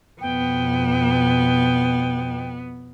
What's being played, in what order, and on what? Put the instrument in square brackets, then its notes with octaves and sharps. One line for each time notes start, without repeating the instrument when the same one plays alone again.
[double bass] F2 B2 [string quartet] B3 [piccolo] G5